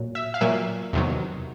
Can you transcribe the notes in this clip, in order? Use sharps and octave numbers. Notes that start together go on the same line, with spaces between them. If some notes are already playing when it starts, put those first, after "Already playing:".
Already playing: A#2 F#3
E5
F5
A#2 F#3 A#3 E5
E2 C3 D#3 F#3